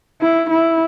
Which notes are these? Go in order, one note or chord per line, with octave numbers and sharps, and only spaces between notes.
E4
E4